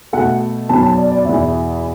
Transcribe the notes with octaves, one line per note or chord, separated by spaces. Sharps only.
B2 A3 F#5
B2 F#3 B3 A5
A5
D5
D5
E2 B2 B3 E5